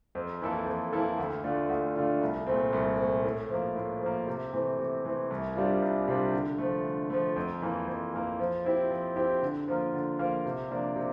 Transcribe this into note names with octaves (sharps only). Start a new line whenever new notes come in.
F2
E3 A#3 E4 A4
F2
E3 A#3 E4 A4
D2
D3 A3 D4 F4
D2
D3 A3 D4 F4
C2
A#2 A3 C4
C2
A#2 A3 C4
A2
F3 A#3
A2
F3 A#3
C3
E3 A3 C4
C3
E3 A3 C4
C2
C3 G3 D4 F4
C2
C3 G3 D4 F4
D3
F3 A3
D3
F3 A3
F2
E3 A#3
F2
E3 A#3
F3
C4 E4 G4
F3
C4 E4 G4
D3
F3 A#3 F4 A#4
D3
F3 A#3 F4 A#4
C3
F3 A#3 D4
C3